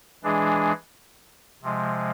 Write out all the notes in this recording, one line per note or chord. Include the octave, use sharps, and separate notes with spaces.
E3 G#3 D4 G#4
C3 F3 G#3